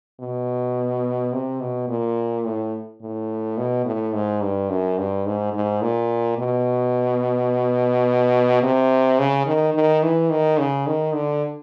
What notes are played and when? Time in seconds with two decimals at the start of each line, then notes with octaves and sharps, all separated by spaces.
0.20 B2
1.33 C3
1.60 B2
1.88 A#2
2.46 A2
3.02 A2
3.58 B2
3.85 A2
4.13 G#2
4.42 G2
4.69 F#2
4.98 G2
5.26 G#2
5.53 G#2
5.82 A#2
6.38 B2
8.62 C3
9.19 C#3
9.47 D#3
9.75 D#3
10.03 E3
10.30 D#3
10.58 C#3
10.87 D#3
11.14 D3